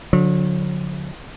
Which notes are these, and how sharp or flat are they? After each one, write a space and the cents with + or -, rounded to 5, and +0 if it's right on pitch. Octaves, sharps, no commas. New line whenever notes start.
D3 -10 F#3 -40